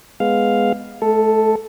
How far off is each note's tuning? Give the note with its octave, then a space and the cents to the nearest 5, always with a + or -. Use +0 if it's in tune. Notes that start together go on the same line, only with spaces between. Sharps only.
G#3 +0 B3 +5 F5 +0
A3 -40 A4 +0